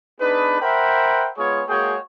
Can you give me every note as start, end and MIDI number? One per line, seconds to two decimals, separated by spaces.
0.20 0.58 59
0.20 0.58 62
0.20 0.58 63
0.20 0.58 68
0.20 0.58 71
0.61 1.28 70
0.61 1.28 72
0.61 1.28 76
0.61 1.28 78
0.61 1.28 79
0.61 1.28 83
1.38 1.61 56
1.38 1.61 59
1.38 1.61 65
1.38 1.61 68
1.38 1.61 73
1.68 1.95 56
1.68 1.95 58
1.68 1.95 66
1.68 1.95 68
1.68 1.95 73
1.68 1.95 79